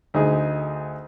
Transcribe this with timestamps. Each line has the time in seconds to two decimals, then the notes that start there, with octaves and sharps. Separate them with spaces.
0.14 D2 D#4 G#4